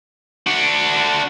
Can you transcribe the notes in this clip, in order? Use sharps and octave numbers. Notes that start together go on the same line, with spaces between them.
D4 F#4